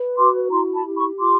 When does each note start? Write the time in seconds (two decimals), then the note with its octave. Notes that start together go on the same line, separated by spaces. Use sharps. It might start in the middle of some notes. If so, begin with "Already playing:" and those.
Already playing: B4
0.17 F#4 C6 D6
0.51 E4 A#5 C6
0.73 A5 B5
0.85 G4
0.96 B5 C#6
1.19 F4 C6 D6